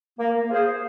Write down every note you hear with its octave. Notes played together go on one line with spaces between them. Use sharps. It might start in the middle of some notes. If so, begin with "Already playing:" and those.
A#3
F4 G#4 C5